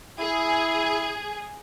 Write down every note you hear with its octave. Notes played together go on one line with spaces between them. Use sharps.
E4 G#4